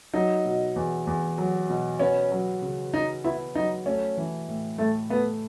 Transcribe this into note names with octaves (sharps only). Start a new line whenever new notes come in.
F#3 D#4
B2
E2
E2
F#3
B2
B3 C#4
F#3
C#3
D#4 F#4
B3 E4
F#3 D#4
A3 C#4
E3
A2
A2 A3
A3 B3